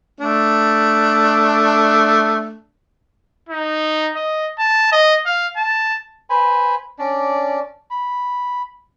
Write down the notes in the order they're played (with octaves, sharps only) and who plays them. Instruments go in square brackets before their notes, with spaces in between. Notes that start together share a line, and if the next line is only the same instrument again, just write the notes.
[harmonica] A3 D4
[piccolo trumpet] D#4
D#5
A5
D#5
F5
A5
[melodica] B4 C5 G#5 B5
C#4 D4 D5
B5